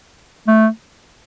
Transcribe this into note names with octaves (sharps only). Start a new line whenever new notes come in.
A3